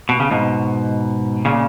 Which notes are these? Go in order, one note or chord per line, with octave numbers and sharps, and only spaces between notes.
B2
C#3
G#2 B2
A#2 C#3